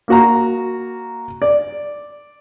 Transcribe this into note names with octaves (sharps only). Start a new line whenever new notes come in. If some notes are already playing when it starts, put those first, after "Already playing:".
A#3 F#4 A#5
D5